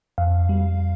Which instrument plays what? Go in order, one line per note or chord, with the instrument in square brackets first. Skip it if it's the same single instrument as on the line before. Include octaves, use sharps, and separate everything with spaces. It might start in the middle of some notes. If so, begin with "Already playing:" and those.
[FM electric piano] F2 F5
G3